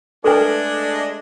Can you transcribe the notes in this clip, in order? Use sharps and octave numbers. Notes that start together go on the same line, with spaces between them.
G#3 A3 D4 A4 B4 G#5